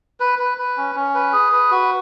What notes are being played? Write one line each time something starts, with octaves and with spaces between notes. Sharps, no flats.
B4
B4
B4
C#4
C#4
B4
G#4
B4
F#4